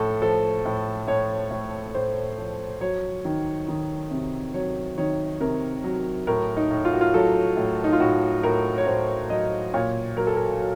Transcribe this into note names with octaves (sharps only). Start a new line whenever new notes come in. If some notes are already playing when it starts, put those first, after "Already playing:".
Already playing: A2 F3 A4
F3 A4
A2
A2 C#5
A2
A2 C5
F3
F#3 C#5
D#3
D#3
C3
F#3 C#5
D#3 C#5
C3 A#4
F#3
A2 A#4
D#4
A2
F4
F#4
F4
F#3 A4
A2
D#4
F4
A2 F#4
A2 A#4
C#5
A2 C5
F#3 D#5
A#2 C#5
F#3 A#4
A4
A#4
F#3